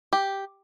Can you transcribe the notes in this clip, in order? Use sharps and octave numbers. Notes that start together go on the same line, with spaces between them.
G4